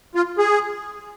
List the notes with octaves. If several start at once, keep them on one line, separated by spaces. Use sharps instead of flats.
F4
G#4